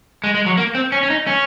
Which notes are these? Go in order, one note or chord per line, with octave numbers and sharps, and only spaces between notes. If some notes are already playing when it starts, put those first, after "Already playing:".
G#3
G#3
F#3
A#3
C4
C#4
C#4
D#4
C#4